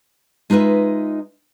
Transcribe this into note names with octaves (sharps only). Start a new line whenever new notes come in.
G#3 D#4 F4 B4 E5